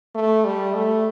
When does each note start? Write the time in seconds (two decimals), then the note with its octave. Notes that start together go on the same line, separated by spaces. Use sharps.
0.15 A3
0.45 G3
0.74 A3